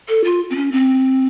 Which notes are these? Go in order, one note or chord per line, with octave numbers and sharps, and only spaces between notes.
A4
F4
C4
C#4
C4